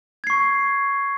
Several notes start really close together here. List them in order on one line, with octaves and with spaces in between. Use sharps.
G#6 C7 C#6